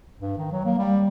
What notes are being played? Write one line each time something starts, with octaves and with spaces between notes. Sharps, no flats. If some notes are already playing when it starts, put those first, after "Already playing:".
G2
D#3
F#3
A#3
G3